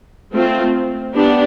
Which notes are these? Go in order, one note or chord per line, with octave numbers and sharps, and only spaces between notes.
A3 C4 F4
B3 D4 G4